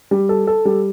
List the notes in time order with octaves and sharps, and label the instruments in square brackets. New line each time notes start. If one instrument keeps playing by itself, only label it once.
[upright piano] G3
A4
A4
G3